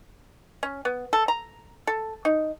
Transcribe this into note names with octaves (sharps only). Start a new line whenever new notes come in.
C#4
B3
A4
A#5
A4
D#4